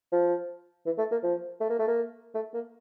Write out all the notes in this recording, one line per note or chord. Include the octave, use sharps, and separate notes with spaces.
F3
E3
A3
A#3
F3
A3
A#3
A3
A#3
A3
A#3